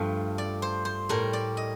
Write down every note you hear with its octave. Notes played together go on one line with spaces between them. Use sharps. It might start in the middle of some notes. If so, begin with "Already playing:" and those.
Already playing: G2 F3 A3 F5
D5
C5
C5
A2 G3 A#4
D5
D#5